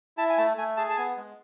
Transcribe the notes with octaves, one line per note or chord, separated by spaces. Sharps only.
E4 A5
G#5
A3 A5
A3 G#5
G#4 A5
A5
B3 G#5
G#3